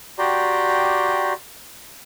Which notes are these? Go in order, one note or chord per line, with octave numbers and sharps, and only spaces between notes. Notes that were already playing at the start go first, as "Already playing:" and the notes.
F#4 G4 D5 G5 A#5 C6